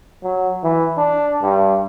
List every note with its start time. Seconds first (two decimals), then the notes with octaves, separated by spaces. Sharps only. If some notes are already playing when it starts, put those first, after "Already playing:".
0.23 F#3
0.64 E3
0.98 D4
1.42 G2